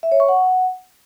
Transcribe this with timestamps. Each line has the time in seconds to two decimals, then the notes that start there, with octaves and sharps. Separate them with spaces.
0.03 E5
0.12 C#5
0.20 C#6
0.28 F#5